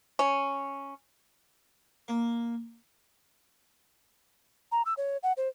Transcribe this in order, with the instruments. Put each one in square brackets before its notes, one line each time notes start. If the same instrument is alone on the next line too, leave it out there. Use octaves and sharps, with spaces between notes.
[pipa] C#4
[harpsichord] A#3
[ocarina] A#5
E6
C#5
F#5
C5